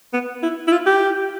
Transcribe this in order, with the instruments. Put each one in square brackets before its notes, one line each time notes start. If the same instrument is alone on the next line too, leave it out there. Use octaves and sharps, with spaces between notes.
[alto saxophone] B3
E4
E4
F4
G4